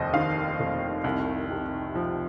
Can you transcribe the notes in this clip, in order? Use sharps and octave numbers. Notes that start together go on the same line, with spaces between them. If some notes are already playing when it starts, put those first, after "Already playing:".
Already playing: F1 D#2 C5 D#5
D#3 F5
F1
C2
C3
F3